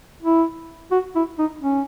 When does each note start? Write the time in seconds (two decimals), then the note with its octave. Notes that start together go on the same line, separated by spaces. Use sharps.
0.23 E4
0.91 F#4
1.15 E4
1.39 D#4
1.61 C#4